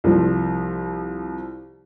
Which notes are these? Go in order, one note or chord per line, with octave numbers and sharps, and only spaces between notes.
C2 F3